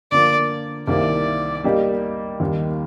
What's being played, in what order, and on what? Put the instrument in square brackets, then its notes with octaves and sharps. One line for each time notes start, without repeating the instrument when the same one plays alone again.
[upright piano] D3 F3 A#3 [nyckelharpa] D5
[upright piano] C2 C3 D#3 A#3 [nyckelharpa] D5
[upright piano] G3 A#3 D#4 G4 D5
D#2 D#3 G3 A#3